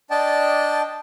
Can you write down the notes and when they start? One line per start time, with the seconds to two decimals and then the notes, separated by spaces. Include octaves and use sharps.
0.11 D4 D5 D#5 G5 A5